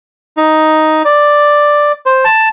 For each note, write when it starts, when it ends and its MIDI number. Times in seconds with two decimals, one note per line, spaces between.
0.37 1.02 63
1.05 1.92 74
2.06 2.25 72
2.25 2.49 81